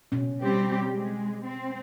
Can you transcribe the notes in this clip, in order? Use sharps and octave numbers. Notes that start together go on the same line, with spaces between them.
B2 C#4
G3 C4 G4
G#3
C4